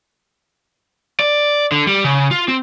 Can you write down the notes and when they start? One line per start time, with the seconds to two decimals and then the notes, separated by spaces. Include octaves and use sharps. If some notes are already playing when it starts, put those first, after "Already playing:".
1.20 D5
1.72 D3
1.87 G3
2.04 C#3
2.31 F4
2.48 C4